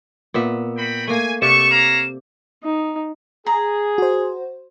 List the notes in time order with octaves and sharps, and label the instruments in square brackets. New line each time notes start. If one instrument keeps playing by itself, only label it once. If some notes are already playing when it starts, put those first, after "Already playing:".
[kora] A#2 B3 E5
[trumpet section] F#4 G5 B5
[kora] A3 A#3 [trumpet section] G#5
[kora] C3 D5 E5 [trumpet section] A3 C#6 [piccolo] E7
[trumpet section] C#5 F5 A#5
[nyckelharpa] D#4
[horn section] G#4 [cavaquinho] A#5
[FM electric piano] F#4 C5